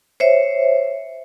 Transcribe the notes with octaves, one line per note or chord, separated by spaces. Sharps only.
C5 C#5 E5